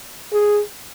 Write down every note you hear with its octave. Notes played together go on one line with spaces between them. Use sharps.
G#4